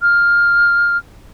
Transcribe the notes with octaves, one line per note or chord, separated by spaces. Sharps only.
F6